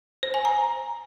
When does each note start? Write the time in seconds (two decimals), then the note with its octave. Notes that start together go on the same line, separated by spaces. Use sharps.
0.23 C5
0.34 G#5
0.45 A#5